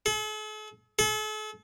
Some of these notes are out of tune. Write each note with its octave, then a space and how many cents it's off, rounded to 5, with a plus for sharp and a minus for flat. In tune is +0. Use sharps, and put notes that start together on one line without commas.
A4 -45
A4 -40